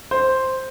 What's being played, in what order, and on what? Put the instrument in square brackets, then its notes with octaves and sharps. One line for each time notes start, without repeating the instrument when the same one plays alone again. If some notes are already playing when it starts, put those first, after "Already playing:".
[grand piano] C5